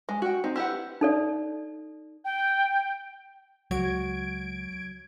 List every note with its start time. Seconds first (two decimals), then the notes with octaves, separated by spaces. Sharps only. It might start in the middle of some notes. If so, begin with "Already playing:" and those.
0.09 G#3
0.22 F#4 G5
0.44 C4 D#4
0.56 E4 G4 B4 F#5
1.01 D#4 A4 D5
2.24 G5
3.71 C#2 F#3 F#4 G#6 D7